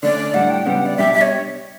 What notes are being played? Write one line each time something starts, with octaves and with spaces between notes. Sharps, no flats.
D3 A3 C#4 D5
A2 G3 D4 F#5
G5
C#2 C#3 G3 B3 F#5
D5
B2 G3 D4 G4 E5
E5
C#5